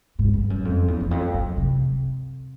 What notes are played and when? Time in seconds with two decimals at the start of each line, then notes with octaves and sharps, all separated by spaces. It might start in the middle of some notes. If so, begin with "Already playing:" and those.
0.19 G#2
0.34 G2
0.50 F#2
0.65 F2
0.88 E2
1.00 E2
1.11 F2
1.34 F#2
1.57 C3